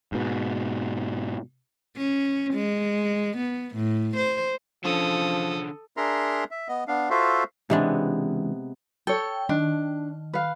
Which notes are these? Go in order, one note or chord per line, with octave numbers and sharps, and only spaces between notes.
G#2 B2
C#4
G#3
B3
A2
C5
D3 F3 C#4 A4 D#6
D4 G#4 A#4 E5 A#5 C6
E5
B3 D#5
B3 D4 F5
F4 F#4 A4 C5 E5 F5
C#2 C3 E3 G#3 B3 D4
A4 C#5 G5
D#3 D4
B4 F5